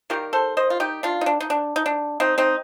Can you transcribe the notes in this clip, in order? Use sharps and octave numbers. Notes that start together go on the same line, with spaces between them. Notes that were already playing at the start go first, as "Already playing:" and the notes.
D#3 G3 A#3 G4 A#4
A4 C5
C5 D#5
F4
D#4 G4
D4 F4
D#4
D4
D#4
D4
D#4
D4
C4 D#4
C4 D#4